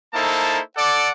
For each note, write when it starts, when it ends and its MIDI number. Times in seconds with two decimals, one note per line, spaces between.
0.14 0.60 58
0.14 0.60 63
0.14 0.60 64
0.14 0.60 69
0.14 0.60 72
0.14 0.60 81
0.77 1.11 69
0.77 1.11 74
0.77 1.11 78
0.77 1.11 86